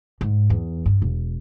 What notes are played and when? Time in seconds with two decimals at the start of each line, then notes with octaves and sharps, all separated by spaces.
0.21 G#2
0.50 E2
0.86 G2
1.02 E1